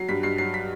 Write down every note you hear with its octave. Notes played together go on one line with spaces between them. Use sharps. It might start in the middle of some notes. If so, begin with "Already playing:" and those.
Already playing: F#3 C7
G2 B6
G2 C7
F#3 C7
B6